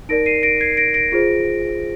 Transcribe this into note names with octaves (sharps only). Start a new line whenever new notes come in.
D#4 A#4 D5 A#6 D7
C7 D#7
A#6 D7
G#6 C7
A#6 D7
A#6 D7
F4 G#4 C5